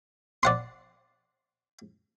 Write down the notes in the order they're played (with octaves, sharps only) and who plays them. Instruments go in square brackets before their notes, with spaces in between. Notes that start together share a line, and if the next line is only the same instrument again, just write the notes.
[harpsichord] D5 F#5 C6